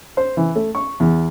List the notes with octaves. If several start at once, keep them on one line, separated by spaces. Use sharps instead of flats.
C5
E3
A3
C#6
E2